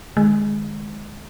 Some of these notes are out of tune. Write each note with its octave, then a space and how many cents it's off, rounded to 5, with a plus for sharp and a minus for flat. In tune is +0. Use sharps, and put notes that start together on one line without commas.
D#3 -25 G#3 +0